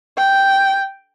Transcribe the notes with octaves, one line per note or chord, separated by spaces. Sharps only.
G5